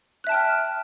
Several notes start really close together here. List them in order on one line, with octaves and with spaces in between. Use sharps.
F#6 E5 A5 G5 F6